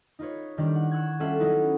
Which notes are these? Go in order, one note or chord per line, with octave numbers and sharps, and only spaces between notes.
D#4 F4 B4 C#5
D#3 G3 D4 E4 G4
F#5
C#6 E6 F#6 G#6
G3 C#4 F4 A4 E5 F#5
F#3 B3 C#4 D#4 E4 F#4